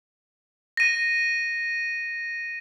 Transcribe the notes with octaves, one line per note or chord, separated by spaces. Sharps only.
A#6 D#7